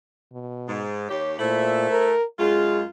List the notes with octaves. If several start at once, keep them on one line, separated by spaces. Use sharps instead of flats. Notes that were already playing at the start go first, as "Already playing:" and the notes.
B2
G#2
D#2 G4 C#5
A#2 A3 E4 C5
A#4
F#2 G#3 F4 G#4